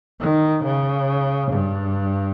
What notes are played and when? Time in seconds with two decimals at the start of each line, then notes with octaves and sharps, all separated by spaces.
0.20 D#3
0.64 C#3
1.52 G2